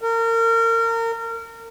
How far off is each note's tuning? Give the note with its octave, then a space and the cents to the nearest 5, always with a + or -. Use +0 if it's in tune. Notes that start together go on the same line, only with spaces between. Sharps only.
A#4 -30